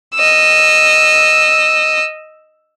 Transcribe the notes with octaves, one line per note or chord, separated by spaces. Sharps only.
D#5 E6